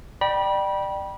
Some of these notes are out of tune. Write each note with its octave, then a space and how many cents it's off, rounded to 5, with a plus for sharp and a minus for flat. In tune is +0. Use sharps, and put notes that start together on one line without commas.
D5 +30 G5 -10 B5 -30